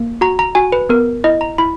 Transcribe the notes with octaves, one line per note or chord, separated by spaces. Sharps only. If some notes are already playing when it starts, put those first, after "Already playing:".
Already playing: A#3
F#4 A#5
A#5
F#4 G#5
B4
B3 A#4
E4 D#5
A#5
E4 B5